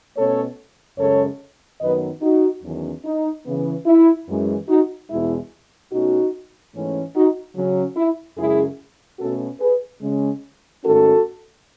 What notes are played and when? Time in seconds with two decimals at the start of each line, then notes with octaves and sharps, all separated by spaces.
0.17 B2 A3 C#4 A4 C#5
0.98 F#2 C#3 G#3 A4 C#5
1.80 F#2 D#3 F#3 B3 B4 D#5
2.21 D#4 F#4
2.63 E2 D#3 F#3 C#4
3.04 D#4
3.45 C#3 E3 B3
3.85 E4
4.27 F#2 E3 G#3
4.68 D#4 F#4
5.09 E2 B2 G#3 E4
5.91 B2 A3 C#4 D#4 F#4
6.74 G#2 E3 A3 C#4
7.15 D#4 F#4
7.55 C#3 F#3 C#4
7.96 E4
8.38 F#2 C#3 G#3 E4 G#4
9.19 B2 A3 C#4 F#4 A4
9.60 G#4 B4
10.01 C#3 G#3 C#4
10.83 G#2 D#3 A3 C#4 F#4 A4